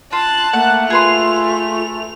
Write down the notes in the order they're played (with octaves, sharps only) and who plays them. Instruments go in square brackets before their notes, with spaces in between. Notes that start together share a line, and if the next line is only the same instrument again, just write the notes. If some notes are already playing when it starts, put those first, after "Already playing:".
[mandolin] F4 [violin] A5 F#6
[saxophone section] A3 [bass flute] A#3 [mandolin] F#5
[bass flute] F4 [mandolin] G#4 B4 C6 [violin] F7
[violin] F7